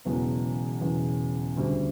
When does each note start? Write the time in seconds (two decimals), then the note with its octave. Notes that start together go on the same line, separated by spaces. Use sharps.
0.05 E1 E2 C#3 F#3 B3
0.81 E1 E2 C#3 F#3 B3
1.57 D2 C#3 G3